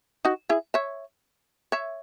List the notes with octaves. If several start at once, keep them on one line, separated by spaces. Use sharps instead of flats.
D#4 F#4
E4 G#4
C#5 E5
C#5 E5